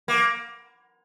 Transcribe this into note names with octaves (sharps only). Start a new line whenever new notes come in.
A#3